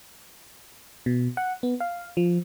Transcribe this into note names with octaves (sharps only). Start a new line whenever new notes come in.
B2
F#5
B3
F5
F3